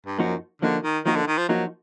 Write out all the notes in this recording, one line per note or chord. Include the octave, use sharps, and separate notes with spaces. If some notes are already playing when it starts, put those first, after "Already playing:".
G2
F#2 F3 A#3 D#4 F#4
D3 F3 A#3 D#4 F#4
D#3
D#3 F3 A#3 D#4 F#4
D3
D#3
F3
F3 F#3 A#3 D#4 F#4